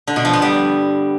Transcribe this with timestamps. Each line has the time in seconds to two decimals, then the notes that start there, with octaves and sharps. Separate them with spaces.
0.07 D3
0.16 B2
0.25 F3
0.33 B3
0.42 G3